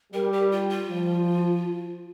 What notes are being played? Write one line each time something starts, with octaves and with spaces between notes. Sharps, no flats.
G3 A#4
G4
F4
F4
F3